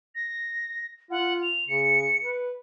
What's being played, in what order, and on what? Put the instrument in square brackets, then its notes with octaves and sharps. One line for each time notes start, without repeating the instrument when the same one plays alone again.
[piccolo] A#6
[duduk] F4 [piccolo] F#5
[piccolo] F7
[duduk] C#3 [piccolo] C#7
[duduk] B4